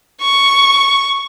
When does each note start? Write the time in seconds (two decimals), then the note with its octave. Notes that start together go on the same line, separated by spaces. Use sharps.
0.21 C#6